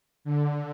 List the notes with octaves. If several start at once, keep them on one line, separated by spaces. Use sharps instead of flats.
D3